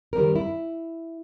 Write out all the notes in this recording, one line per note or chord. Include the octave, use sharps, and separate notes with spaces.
D#3 G3 C4 A#4
E4